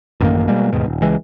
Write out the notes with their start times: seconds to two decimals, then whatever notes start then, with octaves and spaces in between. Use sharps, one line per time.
0.21 A1 F#2 D#3 A#3
0.47 B2 G3 G#3 A#3
0.73 D#2 G#2 B2
0.86 D#1
1.02 C#2 E3 G#3